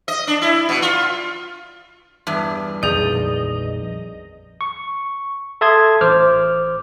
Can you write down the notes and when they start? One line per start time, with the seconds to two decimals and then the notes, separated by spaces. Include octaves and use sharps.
0.08 D#5
0.27 D4
0.42 E4
0.69 B2
0.82 F4
2.27 E2 G2 E5
2.83 A#1 F2 D#3 G#4 D5 D#5 G6
4.61 C#6
5.61 A4 E5 A5 C6 D#6 G#6
6.01 A1 C5 D6 F6